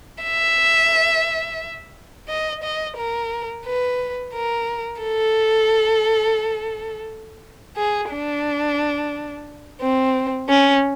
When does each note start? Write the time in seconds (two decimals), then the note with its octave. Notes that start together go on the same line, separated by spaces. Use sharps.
0.23 E5
2.29 D#5
2.63 D#5
2.97 A#4
3.65 B4
4.34 A#4
5.02 A4
7.77 G#4
8.10 D4
9.81 C4
10.49 C#4